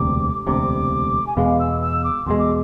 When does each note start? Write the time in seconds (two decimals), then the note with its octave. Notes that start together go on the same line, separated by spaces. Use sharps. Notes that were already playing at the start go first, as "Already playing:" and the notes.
Already playing: E1 D2 C3 D6
0.47 E1 D2 C3 D6
1.26 G#5
1.36 E2 B2 G#3 F5
1.59 E6
1.81 E6
2.04 D6
2.26 E2 B2 G#3 C6
2.39 D6